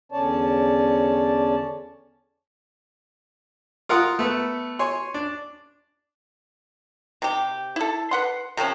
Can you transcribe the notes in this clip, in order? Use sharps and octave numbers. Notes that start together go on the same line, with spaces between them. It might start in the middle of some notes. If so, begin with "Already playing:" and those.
E2 D3 C#4 C#5 D5 A5
F4 A#4 F#5 C6 D#6
A3 B3
C#5 G#5 C6
D4
C3 G4
E4 A4
B4 F#5 C6
C3 F3 C4 C#4